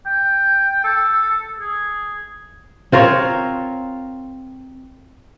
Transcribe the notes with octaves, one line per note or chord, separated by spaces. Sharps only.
G5
A4
G#4
C4 F4 A#4 C#5